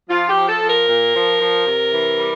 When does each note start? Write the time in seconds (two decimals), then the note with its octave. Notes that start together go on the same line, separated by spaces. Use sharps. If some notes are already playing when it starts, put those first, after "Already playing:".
0.10 F3 F4
0.29 G4
0.35 F3
0.49 A4
0.62 F3
0.69 A#4
0.88 A#2
1.14 F3
1.40 F3
1.66 C3
1.93 E3
2.19 G3